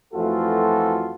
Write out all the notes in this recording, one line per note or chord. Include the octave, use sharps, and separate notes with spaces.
F2 E3 A3 F4 F#4 A4